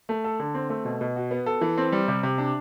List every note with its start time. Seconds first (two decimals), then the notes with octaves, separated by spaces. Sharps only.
0.09 A3
0.24 A4
0.40 D3
0.54 C4
0.70 A3
0.85 B2
1.01 B2
1.16 F#4
1.31 B3
1.46 A4
1.61 E3
1.78 C4
1.92 G3
2.08 C3
2.23 C3
2.38 D4